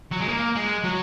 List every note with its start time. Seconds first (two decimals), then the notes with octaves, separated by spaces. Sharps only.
0.11 F#3
0.20 G#3
0.28 A#3
0.55 G#3
0.84 F#3